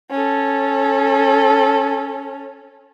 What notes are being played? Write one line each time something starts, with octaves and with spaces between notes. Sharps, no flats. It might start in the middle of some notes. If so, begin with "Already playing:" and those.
C#4 A4